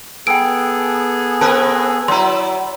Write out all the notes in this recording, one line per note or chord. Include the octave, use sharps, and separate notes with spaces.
B3 G#4 A4 G5 D7
C4 A#4 B4 A5 F#6
F#3 E4 A#5 C6